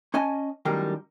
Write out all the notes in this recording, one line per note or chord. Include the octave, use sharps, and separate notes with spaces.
C#4 D#5 G#5 A5
F#2 A2 D#3 G3 A#4 G5